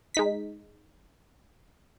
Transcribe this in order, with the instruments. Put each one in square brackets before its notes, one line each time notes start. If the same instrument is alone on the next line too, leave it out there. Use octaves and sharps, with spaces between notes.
[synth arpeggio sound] G#3 D#4 B6